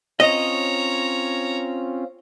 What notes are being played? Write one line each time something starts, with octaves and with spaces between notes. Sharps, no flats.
C4 C#4 F4 C#5 D#5 A#5